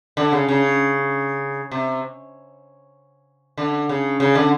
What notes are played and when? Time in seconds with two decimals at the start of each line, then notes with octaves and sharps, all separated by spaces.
0.17 D3
0.32 C#3
0.48 C#3
1.71 C3
3.58 D3
3.89 C#3
4.20 C#3
4.35 D3